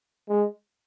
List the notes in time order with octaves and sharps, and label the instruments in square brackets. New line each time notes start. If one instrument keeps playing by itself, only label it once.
[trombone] G#3